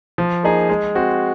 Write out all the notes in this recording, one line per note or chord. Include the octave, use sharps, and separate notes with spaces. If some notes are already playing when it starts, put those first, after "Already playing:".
F3
A#3 D#4 G#4
G#3
C4 F#4